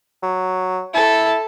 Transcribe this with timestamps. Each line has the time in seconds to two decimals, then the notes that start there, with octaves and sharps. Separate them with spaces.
0.23 F#3
0.94 E4 A4